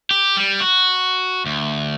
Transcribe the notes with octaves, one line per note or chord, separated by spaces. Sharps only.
G4
G3
F#4
D2